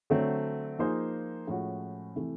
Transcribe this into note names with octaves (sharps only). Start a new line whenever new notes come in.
D3 F#3 A3 C4
F3 A#3 D#4 G#4 C5
A2 F3 G#3 C#4 F#4
C3 E3 A3